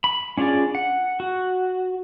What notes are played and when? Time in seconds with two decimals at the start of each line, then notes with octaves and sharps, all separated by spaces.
0.04 B5
0.37 C#4 D4 F4 G#4 D5
0.75 F#5
1.20 F#4